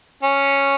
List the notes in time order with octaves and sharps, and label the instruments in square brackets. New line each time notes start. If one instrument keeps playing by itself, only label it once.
[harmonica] C#4